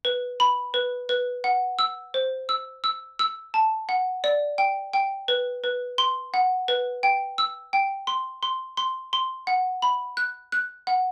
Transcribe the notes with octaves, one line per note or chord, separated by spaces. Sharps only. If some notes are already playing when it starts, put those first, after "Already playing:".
B4
B5
B4
B4
F#5
E6
C5
E6
E6
E6
A5
F#5
D5
G5
G5
B4
B4
C6
F#5
B4
G5
E6
G5
C6
C6
C6
C6
F#5
B5
F#6
F#6
F#5